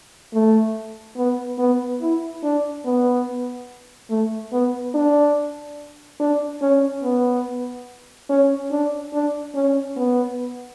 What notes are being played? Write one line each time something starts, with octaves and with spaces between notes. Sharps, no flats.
A3
B3
B3
E4
D4
B3
A3
B3
D4
D4
C#4
B3
C#4
D4
D4
C#4
B3